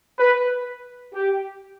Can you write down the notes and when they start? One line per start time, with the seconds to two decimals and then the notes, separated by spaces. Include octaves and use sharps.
0.18 B4
1.14 G4